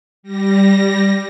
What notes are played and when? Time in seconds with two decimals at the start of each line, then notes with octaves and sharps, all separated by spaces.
0.23 G3 A#6